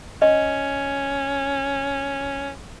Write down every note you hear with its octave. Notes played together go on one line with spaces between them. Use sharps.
C#4 D#5